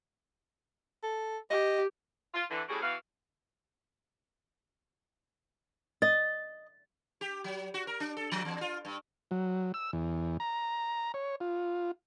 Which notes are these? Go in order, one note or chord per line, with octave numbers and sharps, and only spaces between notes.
A4
G4 D#5
F4
D3 E3
A2 G3 C#4 F#4 G#4 A4
E3 B3 F#4 F5
D#5 A6
G4
F#3
F#4
A#4
D4
A4
F3
E2
F4
G2
F#3
E6
E2
A#5
C#5
F4